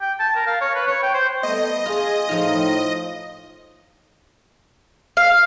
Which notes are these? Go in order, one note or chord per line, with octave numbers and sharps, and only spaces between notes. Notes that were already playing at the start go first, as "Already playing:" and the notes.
G5
A5
A#4
F5
C#5
B4
C#5
G5
C5
G3 A3 B3 D#5
F4 G#4
A2 F3 D#4 F4
F5